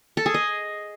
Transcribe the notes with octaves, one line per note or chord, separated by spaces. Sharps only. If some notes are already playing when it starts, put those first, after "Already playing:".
A4
G#4
D#5